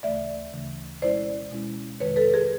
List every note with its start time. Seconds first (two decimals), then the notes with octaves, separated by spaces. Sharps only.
0.03 D2 C#3 E3 A3 D5 E5
0.53 D2 C#3 E3 A3
1.02 B2 G#3 C#4 E4 C5 D5
1.51 B2 G#3 C#4 E4
2.00 F2 C3 D#3 G#3 B4 C#5
2.16 A4 B4
2.33 G#4 A#4